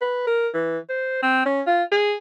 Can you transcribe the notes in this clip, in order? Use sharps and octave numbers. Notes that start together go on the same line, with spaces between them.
B4
A#4
E3
C5
C4
C#4
F4
G#4